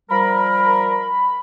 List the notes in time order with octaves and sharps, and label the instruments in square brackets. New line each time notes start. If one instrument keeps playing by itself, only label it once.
[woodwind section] F3 G3 A#4 [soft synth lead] B5